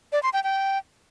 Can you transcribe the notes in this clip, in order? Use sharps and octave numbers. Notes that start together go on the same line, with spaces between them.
D5
C6
G5
G5